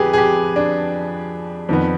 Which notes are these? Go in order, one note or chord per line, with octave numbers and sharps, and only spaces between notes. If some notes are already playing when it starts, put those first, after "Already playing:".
Already playing: F2 G4 G#4 B4
G#4
G4
D4
F2 D#3 B3